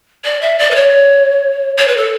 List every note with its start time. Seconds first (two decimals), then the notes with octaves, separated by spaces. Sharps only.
0.25 D5
0.41 E5
0.59 D5
0.71 B4
0.75 C#5
1.78 C#5
1.87 B4
1.97 A4